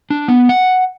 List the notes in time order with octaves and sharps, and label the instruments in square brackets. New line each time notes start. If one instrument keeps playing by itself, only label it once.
[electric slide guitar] D4
B3
F#5